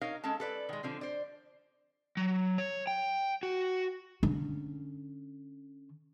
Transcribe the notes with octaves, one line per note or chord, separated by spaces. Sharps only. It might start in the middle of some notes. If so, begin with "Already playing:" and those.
D#4 A#4 C#5 F5
G#3 C#4 A4 A5
A4 B4 D5
D#3 G#3
D3 F3 C4
C5 D5
F#3
C#5
G5
F#4
D3 C#4